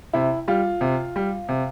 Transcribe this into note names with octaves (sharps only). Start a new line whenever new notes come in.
C3 E4
G3 F4
C3
G3
C3